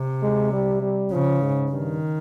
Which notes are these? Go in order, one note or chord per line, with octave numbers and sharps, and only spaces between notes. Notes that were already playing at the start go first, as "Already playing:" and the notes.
Already playing: C3
G#3
G3
G3
C#3 F3
G#2
G2 D#3